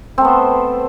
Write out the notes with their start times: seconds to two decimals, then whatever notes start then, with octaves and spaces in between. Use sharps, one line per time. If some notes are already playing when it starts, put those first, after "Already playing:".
0.18 C4
0.21 A3
0.25 B3
0.28 C5